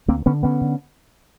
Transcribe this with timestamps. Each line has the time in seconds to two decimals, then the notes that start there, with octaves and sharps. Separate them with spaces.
0.08 D2 A#3 C4
0.26 D3 B3 C#4
0.43 D3 B3 C#4
0.61 D3